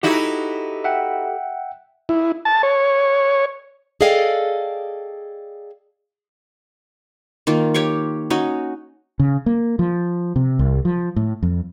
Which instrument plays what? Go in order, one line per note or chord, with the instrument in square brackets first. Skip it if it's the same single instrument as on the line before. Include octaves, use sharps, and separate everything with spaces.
[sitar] D#4 E4 F#4 [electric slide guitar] G4 A4
[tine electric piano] E5 F#5 G5
[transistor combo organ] E4
A5
C#5
[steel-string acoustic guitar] G#4 A4 D5 D#5 F5 G5
[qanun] D#3 A#3 F4
G4 C#5 F5 C#6
C#4 D#4 F#4
[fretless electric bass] C#3
A#3
F3
C3
C2
F3
A2
F2